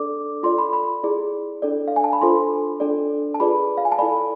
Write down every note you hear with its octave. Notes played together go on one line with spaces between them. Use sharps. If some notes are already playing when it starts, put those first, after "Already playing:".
Already playing: D4 A4 D5 D6
F4 A4 D5 C6
B5
B5
E4 G#4 D5
D4 A4 D5
F5
G#5
A5
B5
D4 F4 A4 C5 C6
D4 A4 D5
A5
F4 G#4 B4 D5 B5
F5
G#5
A5
E4 A4 D5 B5